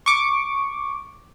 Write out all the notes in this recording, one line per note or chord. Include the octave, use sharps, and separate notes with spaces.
C#6 D6